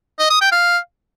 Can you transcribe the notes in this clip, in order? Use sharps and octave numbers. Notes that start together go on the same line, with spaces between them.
D#5
D#6
G5
F5